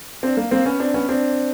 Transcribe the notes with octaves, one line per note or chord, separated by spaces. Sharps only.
C4 D4
A#3
A#3 C4
B3 C#4
C4 D4
B3 C#4
C4 D4